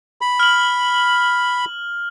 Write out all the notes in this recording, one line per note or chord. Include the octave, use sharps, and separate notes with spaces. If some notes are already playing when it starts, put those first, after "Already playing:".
B5
F6 F#7